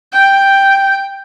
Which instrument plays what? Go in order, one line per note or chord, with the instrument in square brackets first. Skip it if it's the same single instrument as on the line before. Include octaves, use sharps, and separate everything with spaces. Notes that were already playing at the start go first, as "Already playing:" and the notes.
[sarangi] G5